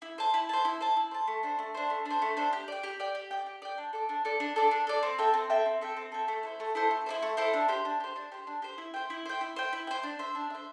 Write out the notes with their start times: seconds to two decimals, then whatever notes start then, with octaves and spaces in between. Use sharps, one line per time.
0.02 E4
0.18 C5 A5
0.34 E4
0.49 C5 A5
0.65 E4
0.81 C5 A5
0.96 E4
1.11 C5 A5
1.28 A3
1.43 D4 C5
1.59 A3
1.74 D4 C5
1.90 A3
2.06 D4 C5
2.22 A3
2.37 D4 C5
2.53 G4
2.68 D5 G5
2.83 G4
3.00 D5 G5
3.15 G4
3.31 D5 G5
3.46 G4
3.62 D5 G5
3.78 D4
3.93 A4 D5
4.09 D4
4.25 A4 D5
4.40 D4
4.56 A4 D5
4.71 D4
4.87 A4 D5
5.03 C4
5.19 A4 E5 G5
5.34 C4
5.50 A4 E5 G5
5.66 C4
5.81 A4 E5 G5
5.97 C4
6.12 A4 E5 G5
6.28 A3
6.43 E4 A4 C5
6.60 A3
6.75 E4 A4 C5
6.91 A3
7.06 E4 A4 C5
7.22 A3
7.37 E4 A4 C5
7.53 D4
7.68 G4 C5
7.85 D4
8.00 G4 C5
8.16 D4
8.32 G4 C5
8.47 D4
8.62 G4 C5
8.78 E4
8.94 C5 G5
9.10 E4
9.26 C5 G5
9.41 E4
9.56 C5 G5
9.73 E4
9.87 C5 G5
10.03 D4
10.19 C5 E5
10.35 D4
10.50 C5 E5